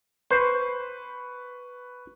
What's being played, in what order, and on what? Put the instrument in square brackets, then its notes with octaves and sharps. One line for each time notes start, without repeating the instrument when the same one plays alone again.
[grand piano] B4 B5 C#6 [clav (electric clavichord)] C5